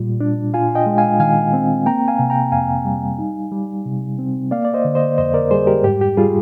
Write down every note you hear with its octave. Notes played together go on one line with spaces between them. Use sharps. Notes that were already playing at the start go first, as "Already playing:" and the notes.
Already playing: A#2 G3 F4
D4
F4 F5 G#5
D#5 G5
G#3
F5 G#5
D#3 F5 G#5
C4
A#3 G5 A#5
F5 G#5
C3
G5 A#5
F2 F5 G#5
G3
D#4
G3
C3
C4
A#3 D5 F5
D5
C5 D#5
D3
C5 D#5
F2 C5 D#5
A#4 D5
G3 G#4 C5
G4 A#4
G#2 G4
G4
G3 F4 G#4